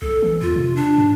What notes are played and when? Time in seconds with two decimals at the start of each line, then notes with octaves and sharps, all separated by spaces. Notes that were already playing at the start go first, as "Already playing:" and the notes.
0.02 B1 A4
0.22 E3
0.42 E2 F4
0.56 C3
0.75 D4
0.98 G#2